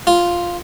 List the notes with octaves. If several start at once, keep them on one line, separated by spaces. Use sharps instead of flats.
F4